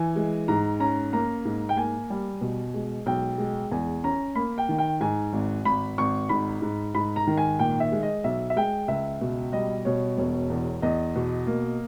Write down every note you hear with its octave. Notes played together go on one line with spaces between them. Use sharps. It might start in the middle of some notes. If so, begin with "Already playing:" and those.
Already playing: E3 G#5
G#3
G#2 A#5
C#4 A#5
A#3 A#5
G#2
G5
A#3 G#5
G3
B2
G#3
B1 G5
G#3
E2 G#5
C#4 A#5
A#3 B5
G5
D#3
G5
G#2 G#5
G#1
G#1 B5
G#1 C#6
G#2 B5
G#2
G#2 B5
A#5
D#3
G#5
A#2 G5
E5
G#3
D#5
B1 E5
E5
G#3 G5
C#2 E5
B2
G3 D#5
B2 C#5
E1 C#5
E2
E2 D#5
B2
A#3